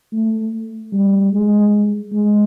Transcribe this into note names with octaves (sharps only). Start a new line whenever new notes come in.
A3
G3
G#3
G#3